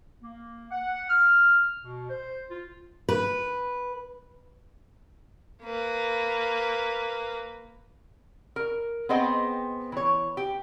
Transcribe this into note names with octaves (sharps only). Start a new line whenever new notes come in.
A#3
F#5
F6
B2
C5
F4
B4
A#3 B4
A#4
B3 C4 G#4 C5 D#5 G5
E3 C#5
G4